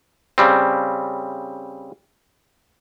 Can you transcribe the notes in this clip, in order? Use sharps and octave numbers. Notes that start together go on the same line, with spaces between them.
C#3 G3 C4